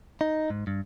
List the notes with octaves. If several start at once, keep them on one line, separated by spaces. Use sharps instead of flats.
D#4
G#2
G2